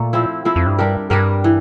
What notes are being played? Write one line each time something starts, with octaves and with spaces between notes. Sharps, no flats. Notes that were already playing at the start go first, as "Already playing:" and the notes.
Already playing: A#2 A3
F3 C4 E4
F3 C4 E4
F2
G2
G3 D4 G4 A#4
G2 G3 D4 G4 A#4
E3